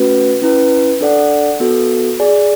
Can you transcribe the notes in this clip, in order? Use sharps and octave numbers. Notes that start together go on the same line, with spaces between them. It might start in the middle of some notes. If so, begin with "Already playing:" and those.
Already playing: A3 C#4 F#4 B4
C#4 E4 B4
D4 A4 D5 F#5
B3 F#4 A4
G#4 D5 G#5